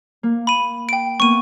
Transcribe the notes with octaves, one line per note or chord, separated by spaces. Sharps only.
A#3
B5 D#7
G5 D7
A#3 B3 C#6 D#7